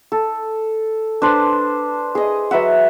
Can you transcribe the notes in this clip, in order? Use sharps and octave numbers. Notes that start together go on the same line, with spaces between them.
A4
D4 B4 C5
G#4 D#5
F#3 B4 E5 F#5